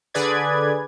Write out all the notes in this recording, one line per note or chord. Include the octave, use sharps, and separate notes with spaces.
D3 G#4 B4 D5 G#6